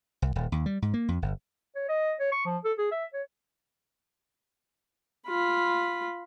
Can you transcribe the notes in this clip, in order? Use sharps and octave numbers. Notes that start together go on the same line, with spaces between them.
C2
D#1
D#2
G3
G#2
A#3
F2
G1
C#5
D#5
C#5
C#6
F3
A4
G#4
E5
C#5
F4 B5